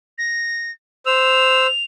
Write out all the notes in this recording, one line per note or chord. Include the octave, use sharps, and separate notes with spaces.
A#6
C5 E6 F7